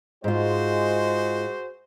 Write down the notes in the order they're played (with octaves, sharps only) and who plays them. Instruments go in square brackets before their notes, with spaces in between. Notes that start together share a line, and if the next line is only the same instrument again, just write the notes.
[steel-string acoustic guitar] G#2 F4 [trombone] G#3 [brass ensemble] F#4 G#4 C5